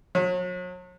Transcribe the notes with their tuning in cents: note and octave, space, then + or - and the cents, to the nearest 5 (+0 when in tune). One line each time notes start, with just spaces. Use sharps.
F#3 -35